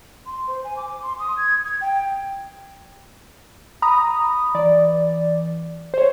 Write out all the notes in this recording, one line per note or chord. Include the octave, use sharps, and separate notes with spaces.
C6
C5
G#5
D6
C6
D#6
G#6
G#6
G5
A#5 B5 D#6
E3 D5
C5 C#5